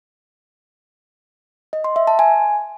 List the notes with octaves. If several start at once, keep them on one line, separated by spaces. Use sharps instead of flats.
D#5
C6
E5
A5
G#5